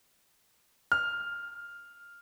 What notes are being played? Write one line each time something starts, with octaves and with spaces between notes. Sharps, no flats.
F6